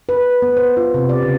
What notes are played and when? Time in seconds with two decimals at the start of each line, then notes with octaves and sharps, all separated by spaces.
0.09 B4
0.42 B3
0.57 C5
0.77 F4
0.94 C3
1.09 D5
1.22 C#3